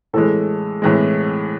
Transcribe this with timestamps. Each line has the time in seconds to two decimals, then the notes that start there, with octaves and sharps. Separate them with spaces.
0.13 A2 E3 G#3 A4
0.82 A2 E3 G#3